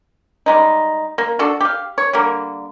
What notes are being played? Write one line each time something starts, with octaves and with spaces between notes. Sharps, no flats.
G3 G#3 D#4
A#3
D4 F#4 A4
G4 F5
C#5
D3 G3 A#3